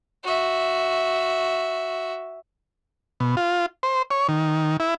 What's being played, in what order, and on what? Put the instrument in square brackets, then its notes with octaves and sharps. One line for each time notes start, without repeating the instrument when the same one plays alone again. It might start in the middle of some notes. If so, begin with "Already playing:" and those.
[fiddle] F#4 E5
[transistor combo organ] B2
F4
C5
C#5
D#3
E4